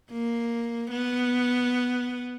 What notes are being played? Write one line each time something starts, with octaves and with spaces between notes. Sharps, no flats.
A#3
B3